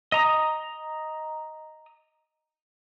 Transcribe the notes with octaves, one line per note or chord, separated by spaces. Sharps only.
D#5 A#5 D#6